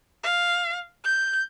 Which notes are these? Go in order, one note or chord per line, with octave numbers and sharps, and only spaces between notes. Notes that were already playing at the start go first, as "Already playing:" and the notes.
F5
G6